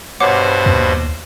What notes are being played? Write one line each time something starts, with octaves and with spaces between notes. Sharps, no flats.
G2 B2 C5 C#5 F#5 D6
D#2